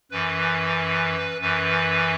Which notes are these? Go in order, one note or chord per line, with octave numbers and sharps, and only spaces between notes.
F#2 E3 B4
F#2 E3 B4